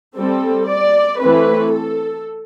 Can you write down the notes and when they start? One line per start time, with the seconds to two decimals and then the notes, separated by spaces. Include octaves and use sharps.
0.17 G3 C4 A4
0.69 D5
1.21 E3 A3 C4 B4
1.73 A4